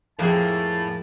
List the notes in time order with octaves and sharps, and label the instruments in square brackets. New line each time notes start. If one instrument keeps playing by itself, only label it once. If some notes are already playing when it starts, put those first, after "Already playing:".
[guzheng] F2 [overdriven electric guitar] A2 [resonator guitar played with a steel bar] A#3 G#4 [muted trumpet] A5